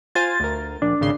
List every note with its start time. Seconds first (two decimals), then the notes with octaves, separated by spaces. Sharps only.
0.15 F4 C5 G#5 A6
0.40 D2 A#4
0.82 A#1 D4
1.01 G#1 C#3 C6